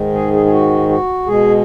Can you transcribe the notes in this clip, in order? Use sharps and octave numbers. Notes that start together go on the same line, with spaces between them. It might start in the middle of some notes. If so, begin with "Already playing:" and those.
Already playing: G#2 D#3 G#3
G#4
G#4
G#4
F#4
F#4
B2 G#3 G#4